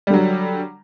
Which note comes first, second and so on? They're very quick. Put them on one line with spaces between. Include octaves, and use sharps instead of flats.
G3 D3 F#3